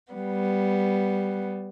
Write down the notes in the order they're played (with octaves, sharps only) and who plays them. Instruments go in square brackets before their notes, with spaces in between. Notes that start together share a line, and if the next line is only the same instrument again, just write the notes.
[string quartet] G3 B3